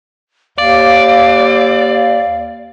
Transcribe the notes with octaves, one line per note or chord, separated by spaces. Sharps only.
D#2 D5 F5